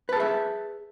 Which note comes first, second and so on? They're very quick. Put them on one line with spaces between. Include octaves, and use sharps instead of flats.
B4 A5 G#4 E5